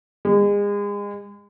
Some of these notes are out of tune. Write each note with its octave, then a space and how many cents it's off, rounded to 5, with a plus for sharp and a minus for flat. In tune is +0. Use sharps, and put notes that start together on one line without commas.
G#3 -35